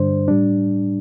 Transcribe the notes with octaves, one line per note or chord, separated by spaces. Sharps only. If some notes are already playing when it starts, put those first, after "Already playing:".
Already playing: G2 D3 G3 D4 C5
A2 G3 D4